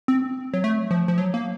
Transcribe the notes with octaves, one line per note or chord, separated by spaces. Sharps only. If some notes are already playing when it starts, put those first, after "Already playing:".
C4
F#3
A3
F3
F3
F#3
A#3